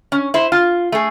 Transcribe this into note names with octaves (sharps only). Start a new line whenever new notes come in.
C#4
E4 C5
F4
A3 G#4